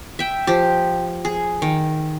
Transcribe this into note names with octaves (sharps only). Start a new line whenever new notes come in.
E5 G5
F3 G4
G#4
D#3